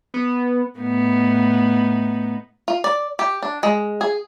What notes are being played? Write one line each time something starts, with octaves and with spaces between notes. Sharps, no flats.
B3
A2 B3 D#4
F4
D5
G4
D4
G#3
G#4